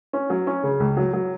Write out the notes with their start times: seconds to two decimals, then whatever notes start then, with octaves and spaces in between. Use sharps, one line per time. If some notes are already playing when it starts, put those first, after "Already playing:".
0.13 C#4
0.30 F#3
0.47 C#4
0.63 C#3
0.80 C#2
0.97 F#3
1.13 F#3